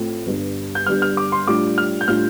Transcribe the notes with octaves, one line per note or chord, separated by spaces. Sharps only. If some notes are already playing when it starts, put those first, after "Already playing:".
Already playing: A2 A3 C4 F4
G1 G2 G3
G6
G1 G2 G3 F6
F6
D6
C6
A2 G3 D4 F4 D6
F6
G6
A2 G3 D4 F4 F6